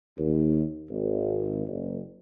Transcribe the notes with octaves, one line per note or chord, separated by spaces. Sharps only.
D#2
G#1
F#1